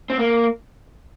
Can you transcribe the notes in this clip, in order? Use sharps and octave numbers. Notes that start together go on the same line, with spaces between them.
C4
A#3